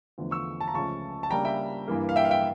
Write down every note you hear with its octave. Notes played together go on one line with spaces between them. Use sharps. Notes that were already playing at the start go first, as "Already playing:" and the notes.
E2 D3 F3 A3
C#6 E6
A5
A#5
C#2 C#3 F3 A3 C#4 A5 C#6
A5
C#3 G3 A#3 D4 G5 A#5
E5 G5
G2 E3 A#3
F5
E5 G5
F5
E5 G5